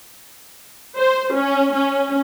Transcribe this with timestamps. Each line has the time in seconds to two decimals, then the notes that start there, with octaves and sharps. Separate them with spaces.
0.99 C5
1.33 C#4
1.73 C#4